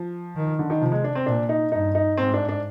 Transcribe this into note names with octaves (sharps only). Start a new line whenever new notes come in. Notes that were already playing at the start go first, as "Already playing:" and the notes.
Already playing: F3
D#3
D3
D#3
C3 F3
G#3
D4
C4
A#2 D4
D#4
G2 D#4
D#4
G#2 C4
D4
D4